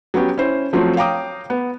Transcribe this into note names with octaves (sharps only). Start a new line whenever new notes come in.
F#3 B3 C#4 G4
C#4 E4 C5
F3 F#3 A3 C4 F4
C#5 F5 G5 A#5 D6 D#6
B3